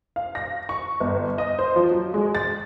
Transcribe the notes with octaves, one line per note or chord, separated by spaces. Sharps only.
F5
A#6
C#6
G1
D#5
C5
F3
F#3
G#3
A6